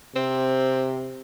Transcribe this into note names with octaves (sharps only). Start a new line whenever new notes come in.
C3 C4